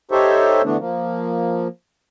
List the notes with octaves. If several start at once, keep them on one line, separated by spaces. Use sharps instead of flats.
D#4 G4 A4 C5 C#5 E5
D3 E3 A3 B3 D4
F3 A#3